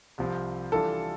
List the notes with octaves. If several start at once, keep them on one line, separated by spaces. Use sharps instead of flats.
C2 C3 F3 C4
E3 G3 D4 F4 A4